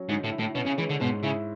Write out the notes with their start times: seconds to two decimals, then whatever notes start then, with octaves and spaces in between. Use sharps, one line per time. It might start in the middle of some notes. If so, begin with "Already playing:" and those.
Already playing: F#3 C#4
0.09 G#2 D3
0.24 A2
0.32 E4
0.39 A2
0.55 B2 C#4
0.66 C#3
0.78 E3 G#3
0.89 D3
1.00 G#2 B2
1.23 C#3 E4